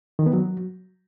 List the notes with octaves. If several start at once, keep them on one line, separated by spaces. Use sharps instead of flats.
D#3
B3
F#3